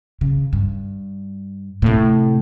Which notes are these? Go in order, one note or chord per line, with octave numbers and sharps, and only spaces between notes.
C#3
G2
A2 C3